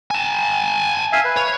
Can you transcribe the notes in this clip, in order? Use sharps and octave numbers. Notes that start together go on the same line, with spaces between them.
G#5 A5
E5 F5 G#5
B4
C#5